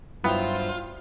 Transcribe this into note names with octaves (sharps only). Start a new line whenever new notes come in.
G2 F#3 B3 E4 F4 C5 G5